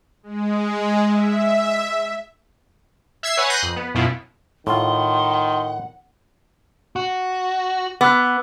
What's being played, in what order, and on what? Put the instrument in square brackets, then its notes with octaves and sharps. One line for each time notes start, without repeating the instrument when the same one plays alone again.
[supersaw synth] G#3
E5
[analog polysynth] E5 E6 G#6 C7
B4 C#5 F#5 G#5
F#6 G6 A#6 C7 D#7
F2
B3
F#2 B2 B3 E4 F4
[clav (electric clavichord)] A2 F4 [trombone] D#3 [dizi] F#5 [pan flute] C6
[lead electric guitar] F#4
[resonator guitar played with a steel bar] B3 [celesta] D6 E6 F#6